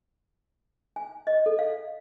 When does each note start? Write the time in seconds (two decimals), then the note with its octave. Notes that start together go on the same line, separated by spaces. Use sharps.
0.96 G#5
1.27 D#5
1.46 A4
1.59 F5